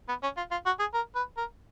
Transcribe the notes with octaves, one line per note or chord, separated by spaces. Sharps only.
B3
C#4
F4
F4
F#4
G#4
A#4
B4
A#4